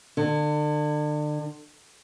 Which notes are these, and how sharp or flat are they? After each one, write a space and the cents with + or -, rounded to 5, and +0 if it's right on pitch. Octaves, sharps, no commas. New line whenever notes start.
D3 +35